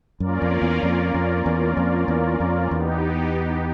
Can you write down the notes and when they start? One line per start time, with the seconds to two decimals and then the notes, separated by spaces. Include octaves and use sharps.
0.20 F#2 A#3 C#4 F4 A#4 D5
0.42 F2
0.62 E2
0.83 F2
1.14 F2
1.46 E2
1.77 F2
2.08 E2
2.40 F2
2.71 E2 B3 D#4 G4